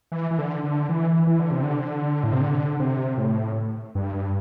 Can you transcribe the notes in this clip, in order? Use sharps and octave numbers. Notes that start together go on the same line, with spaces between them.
E3
E3
D3
D3
E3
E3
D3
C3
D3
A2
C3
D3
C3
A2
G2